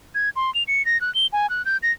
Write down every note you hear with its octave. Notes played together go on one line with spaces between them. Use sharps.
G#6
C6
F7
C#7
A#6
F#6
G7
G#5
F#6
G6
A#6